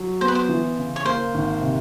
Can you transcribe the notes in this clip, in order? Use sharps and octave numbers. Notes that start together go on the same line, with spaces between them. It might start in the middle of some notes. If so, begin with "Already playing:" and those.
Already playing: F#3
B3 C5
B4
C5
E3
C#3
C#5
A#3 C5
G#1
C3